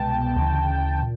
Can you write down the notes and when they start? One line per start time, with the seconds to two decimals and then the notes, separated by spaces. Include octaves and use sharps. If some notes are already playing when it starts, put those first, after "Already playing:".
Already playing: C2 B2 G#3 B3 G5 A5
0.35 D2 C#3 E3
1.00 A#2